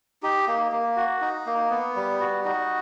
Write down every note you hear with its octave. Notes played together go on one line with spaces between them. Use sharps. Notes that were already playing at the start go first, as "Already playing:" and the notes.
D#4 G4
A#3
A#3
F#4
D#4
A#3
B3
G3
F#4
D#4 F#4